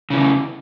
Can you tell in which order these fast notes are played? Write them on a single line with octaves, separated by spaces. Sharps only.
C#3 E3 E2